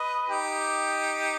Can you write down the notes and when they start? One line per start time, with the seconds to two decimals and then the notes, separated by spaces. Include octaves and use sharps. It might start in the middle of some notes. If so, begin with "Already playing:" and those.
Already playing: B4 D#5
0.29 D#4 G4